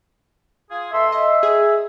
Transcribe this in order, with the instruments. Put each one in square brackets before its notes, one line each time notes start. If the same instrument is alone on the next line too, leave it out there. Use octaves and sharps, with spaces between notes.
[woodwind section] F4 G#4
[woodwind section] B2 A4 C6 [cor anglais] E5
[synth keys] D#5 [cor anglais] E5
[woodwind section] D#4 G#5 [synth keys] G#4